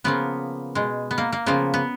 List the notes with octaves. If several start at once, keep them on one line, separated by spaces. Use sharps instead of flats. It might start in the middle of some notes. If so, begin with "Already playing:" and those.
C#3 F3 A#3 B3
B2 G#3
B3
A#3
A#3
C#3 F3 A#3 B3
B3